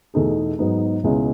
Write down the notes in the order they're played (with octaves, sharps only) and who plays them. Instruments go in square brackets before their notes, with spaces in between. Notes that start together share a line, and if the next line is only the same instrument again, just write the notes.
[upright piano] E2 B2 A3 D#4 G#4
G#2 F#3 B3 D#4
C#2 B2 G#3 C#4 E4